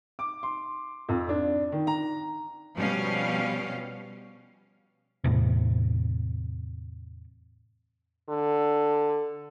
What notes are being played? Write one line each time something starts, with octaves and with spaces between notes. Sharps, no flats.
D6
C6
F2
D4
D#3
A#5
B2 F3 G3 C#4 F5
E2 A2 C3
D3